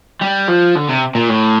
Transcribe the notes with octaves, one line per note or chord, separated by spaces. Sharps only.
G3
F3
D3
C3
A#2
A2